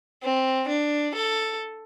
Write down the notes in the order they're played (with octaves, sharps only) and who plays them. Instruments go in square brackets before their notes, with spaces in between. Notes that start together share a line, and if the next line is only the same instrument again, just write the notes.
[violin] C4
D4
A4